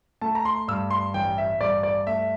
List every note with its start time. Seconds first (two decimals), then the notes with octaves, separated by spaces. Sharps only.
0.21 A3 A5
0.35 A#5
0.45 C6
0.68 G2 E6
0.91 C6
1.14 A1 G5
1.38 E5
1.60 G2 D5
1.83 D5
2.07 A3 E5